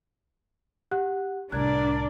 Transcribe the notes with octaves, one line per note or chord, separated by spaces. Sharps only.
G4 F#5 F#6
C2 A2 D4 A#4 D5 F#6 G#6